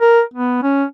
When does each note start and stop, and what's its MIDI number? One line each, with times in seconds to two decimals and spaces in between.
0.01 0.22 70
0.34 0.62 59
0.63 0.84 61